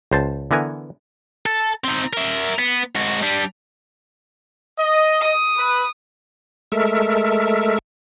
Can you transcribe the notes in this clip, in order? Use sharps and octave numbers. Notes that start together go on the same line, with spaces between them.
C#2 C5 A5
D3 E3 B3 A#4 G#5
A4
C4 D#4
A#4 E5
B3
G#2 F#4
G3 D4
D#5
D#6
B4
G#3 A3 A4 A#4 E5